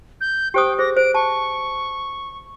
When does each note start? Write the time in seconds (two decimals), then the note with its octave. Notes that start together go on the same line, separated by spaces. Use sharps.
0.21 G6
0.54 G4 C5 G5 D#6
0.79 G#4 C5 A#6
0.97 C5 D7
1.14 A5 C#6